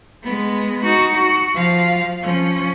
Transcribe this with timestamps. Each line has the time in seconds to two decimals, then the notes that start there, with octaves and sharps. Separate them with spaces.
0.24 G#3 B3
0.84 D#4 F#4
1.14 F#4
1.54 F3 F5
2.22 F3 C#4